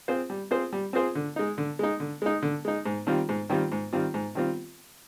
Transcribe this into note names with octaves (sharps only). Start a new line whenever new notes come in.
C4 F4 G#4 C5
G3
C4 F4 G#4 C5
G3
C4 F4 G#4 C5
D3
G#3 D#4
D3
G#3 D#4
D3
G#3 D#4
D3
G#3 D#4
G#2
D#3 G3 C4 F4
G#2
D#3 G3 C4 F4
G#2
D#3 G3 C4 F4
G#2
D#3 G3 C4 F4